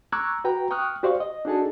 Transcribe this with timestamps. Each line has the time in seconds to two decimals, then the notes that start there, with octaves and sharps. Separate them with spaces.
0.12 A#5 C#6 D6 E6 F#6 G#6
0.44 F#4 B4 G5 A#5
0.71 G5 C#6 D#6 F6 F#6
1.03 F#4 G4 C5 D5 F5 C#6
1.20 D#5
1.45 D4 D#4 F#4 G#4 A4 A5